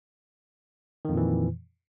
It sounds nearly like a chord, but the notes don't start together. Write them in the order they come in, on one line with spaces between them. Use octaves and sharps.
D#3 F2 A#2 E3